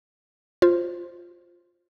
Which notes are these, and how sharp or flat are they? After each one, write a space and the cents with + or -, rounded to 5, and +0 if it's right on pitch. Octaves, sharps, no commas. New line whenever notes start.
F4 +0 C5 +0